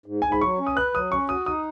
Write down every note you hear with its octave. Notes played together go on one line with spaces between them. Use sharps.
G#2
G#2 G#5
B5
F#3 C#6
C#4
D#6
B4 F#6
F#3 D#6
C#4 C#6
F#4 D#6
D#4 D#6